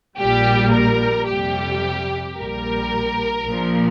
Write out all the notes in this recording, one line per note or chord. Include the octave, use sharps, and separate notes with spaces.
A#1 A#2 G3 G4
A#4
F2 C3 G3 G4
A#1 A#2 G3 A#4
A#1 A#2 F3